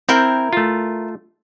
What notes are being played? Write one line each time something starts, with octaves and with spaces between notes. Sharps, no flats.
C4 E4 A#4 G5
A3 F4